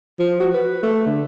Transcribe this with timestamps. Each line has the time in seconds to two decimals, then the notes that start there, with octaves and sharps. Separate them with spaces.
0.19 F3
0.40 F#4
0.54 B4
0.83 A3
1.06 D3